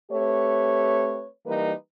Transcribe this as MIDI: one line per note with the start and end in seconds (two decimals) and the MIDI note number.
0.11 1.26 57
0.11 1.26 60
0.11 1.26 67
0.11 1.26 71
0.11 1.26 73
1.46 1.72 52
1.46 1.72 55
1.46 1.72 58
1.46 1.72 63
1.46 1.72 70
1.46 1.72 71